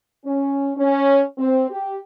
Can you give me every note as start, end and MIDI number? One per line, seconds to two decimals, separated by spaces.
0.25 0.71 61
0.77 1.21 61
1.38 1.69 60
1.70 1.98 67